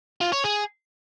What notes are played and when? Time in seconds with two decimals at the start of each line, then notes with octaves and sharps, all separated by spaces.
0.21 F4
0.32 C#5
0.44 G#4